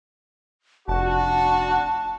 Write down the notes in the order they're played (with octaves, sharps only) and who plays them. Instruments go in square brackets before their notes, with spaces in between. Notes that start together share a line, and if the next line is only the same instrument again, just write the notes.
[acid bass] F1 [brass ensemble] D4 F#4 [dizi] A5